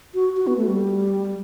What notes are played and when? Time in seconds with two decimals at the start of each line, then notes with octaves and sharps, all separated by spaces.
0.14 F#4
0.37 F#4
0.47 B3
0.57 A3
0.67 G3